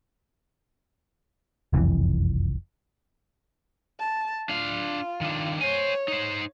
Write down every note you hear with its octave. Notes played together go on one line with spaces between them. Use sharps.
F#1 C2 F2 E3
A5
D4 F4 F5
D#3 D4
C5 C#5 G#5
D#4 C5